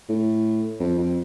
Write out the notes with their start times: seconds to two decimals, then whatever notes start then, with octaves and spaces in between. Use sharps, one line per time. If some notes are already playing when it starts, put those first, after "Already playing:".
0.09 A2
0.80 F2
0.98 F2